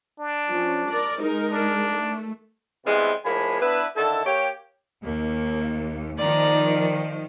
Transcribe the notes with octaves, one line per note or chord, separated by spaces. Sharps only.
D4
F3 C#4
A#4 D5
G#3 D#4 A#4
D4
A3
C3 E3 G3 G#3 B3 C4
A2 F3 G#3 A#3 G#5 B5
B3 D4 E4 B4
D3 D#3 E4 A4
A#3 G4 C#5
D#2 A#3
D#3 F3 D5 A#5